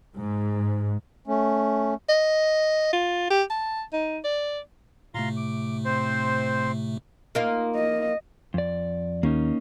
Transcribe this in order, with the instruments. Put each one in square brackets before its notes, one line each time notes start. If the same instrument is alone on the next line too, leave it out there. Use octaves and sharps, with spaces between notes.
[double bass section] G#2
[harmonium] A3 C#4
[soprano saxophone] D#5
F4
G4
A5
D#4
D5
[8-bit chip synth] A2 C3 A3 [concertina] F4 A#5 C6
[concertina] D6
C4 C5
[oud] A#3 D#4 F4
[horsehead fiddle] D#5
[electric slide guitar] F2 D5
[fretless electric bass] D#2 [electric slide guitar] A#3 C#4 D#4